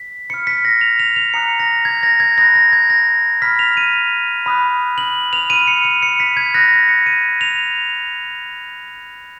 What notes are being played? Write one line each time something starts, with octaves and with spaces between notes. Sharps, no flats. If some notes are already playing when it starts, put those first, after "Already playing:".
Already playing: B6
B5 F6 C#7
B6
A#6
F7
F7
F7
A#5 D#6 F#6 C#7
A#6
G#6
A#6
G#6
B5 D#6 F#6 A#6
A#6
G#6
A#6
B5 F6 B6
F7
D#7
B5 D#6 F#6
F#7
F7
B5 F6 D#7
C#7
D#7
C#7
B6
G#6
B5 D#6 F#6 A#6
C#7
D#7
F7